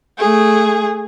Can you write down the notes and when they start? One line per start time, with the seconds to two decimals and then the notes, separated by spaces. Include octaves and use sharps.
0.18 A3 G#4